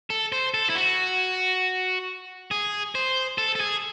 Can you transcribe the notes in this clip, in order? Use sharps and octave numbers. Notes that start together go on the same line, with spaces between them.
A4
C5
A4
E4
F#4
G#4
C5
A4
A4
G#4